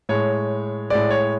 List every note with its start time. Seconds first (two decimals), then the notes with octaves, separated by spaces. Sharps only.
0.09 A2 G#3 C#5
0.90 A2 G#3 D5
1.10 C#5